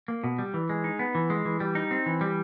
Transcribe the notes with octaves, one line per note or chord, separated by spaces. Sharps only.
A#3
B2
G3
E3
G#3
D#4
B3
E3
G#3
E3
G3
D#4
C4
E3
G3